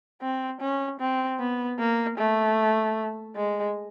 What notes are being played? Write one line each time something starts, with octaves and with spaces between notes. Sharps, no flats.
C4
C#4
C4
B3
A#3
A3
G#3